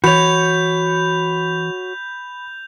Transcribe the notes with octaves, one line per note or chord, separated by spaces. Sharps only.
E3 F#4 C#5 B5 G6 F7